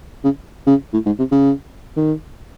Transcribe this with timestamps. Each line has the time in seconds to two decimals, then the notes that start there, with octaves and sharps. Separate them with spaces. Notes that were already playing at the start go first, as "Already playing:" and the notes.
0.24 C#3
0.67 C#3
0.93 A2
1.06 G#2
1.19 C3
1.32 C#3
1.97 D#3